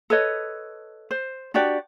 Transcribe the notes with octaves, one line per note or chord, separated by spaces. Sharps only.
A4 B4 C#5 D#5
C5
D4 F#4 G4 D5